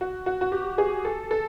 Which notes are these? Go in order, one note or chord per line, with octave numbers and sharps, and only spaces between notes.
F#4
F#4
F#4
G4
G#4
A4
A4